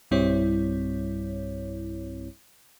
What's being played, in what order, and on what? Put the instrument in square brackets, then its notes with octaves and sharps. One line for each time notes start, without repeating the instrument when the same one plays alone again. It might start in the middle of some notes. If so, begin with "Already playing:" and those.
[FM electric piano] B1 G2 G3 C4 E4 C#5